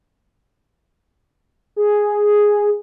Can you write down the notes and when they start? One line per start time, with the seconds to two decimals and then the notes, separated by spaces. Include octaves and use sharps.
1.76 G#4